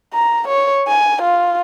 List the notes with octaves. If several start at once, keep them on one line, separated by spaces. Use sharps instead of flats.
A#5
C#5
G#5
F4